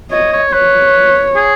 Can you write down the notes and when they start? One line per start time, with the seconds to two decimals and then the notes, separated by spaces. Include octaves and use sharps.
0.11 C#5 D#5
0.32 C#5
0.52 B4 C#5
1.36 G#4